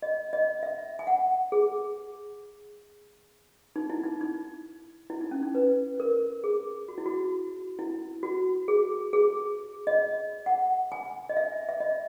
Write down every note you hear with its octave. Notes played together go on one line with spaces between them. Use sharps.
D#5
D#5
E5
G#5
F#5
G#4
D#4
E4
D#4
D#4
E4
D#4
C#4
D#4
B4
A#4
G#4
F#4
E4
F#4
E4
F#4
G#4
G#4
D#5
F#5
G#5
D#5
E5
E5
D#5